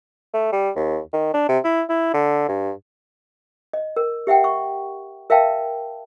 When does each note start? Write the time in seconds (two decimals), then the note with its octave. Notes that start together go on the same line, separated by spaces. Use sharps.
0.34 A3
0.52 G3
0.76 D#2
1.13 D#3
1.34 D4
1.48 C3
1.64 E4
1.89 E4
2.14 D3
2.48 G2
3.73 D#5
3.96 A#4
4.27 G4 E5 F#5 G5
4.44 C#6
5.30 A#4 E5 F5 G5 A5